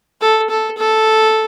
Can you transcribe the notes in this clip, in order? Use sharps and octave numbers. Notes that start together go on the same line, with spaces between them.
A4
A4
A4